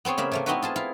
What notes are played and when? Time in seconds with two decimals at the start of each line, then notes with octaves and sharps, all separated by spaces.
0.05 B3 C4 G#4 C#5
0.18 C#3 A#3 E5 B5
0.32 C3 A3 A#3
0.46 B3 C4 D#4 E4 F#4 B4
0.62 F4 G#4 A5
0.76 E4 F4 F5